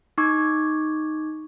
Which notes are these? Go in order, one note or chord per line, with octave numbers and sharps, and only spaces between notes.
D#4 C#6 D6 G#6